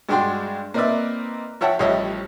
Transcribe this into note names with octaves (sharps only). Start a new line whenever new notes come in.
G2 G#3 D4 F#4 G5 C6
A#3 C4 D#4 B4 D5 E5
F3 C#5 E5 F#5 G5 A5
A1 F3 G3 C#5 D#5 E5